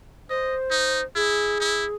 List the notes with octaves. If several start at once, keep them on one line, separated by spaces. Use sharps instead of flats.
C5 D#5
D#4
E4 G#4
E4